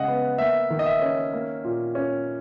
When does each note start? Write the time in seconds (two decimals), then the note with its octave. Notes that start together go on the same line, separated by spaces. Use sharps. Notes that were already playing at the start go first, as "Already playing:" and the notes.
Already playing: C#3 G#3 D#5 F#5
0.08 B3
0.38 A#3 E5
0.70 D#3
0.79 D#5
0.86 E5
1.02 C#4
1.33 A#3
1.64 A#2
1.95 C#4